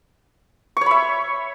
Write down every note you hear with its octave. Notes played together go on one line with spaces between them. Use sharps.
C#5 E5 B5 C#6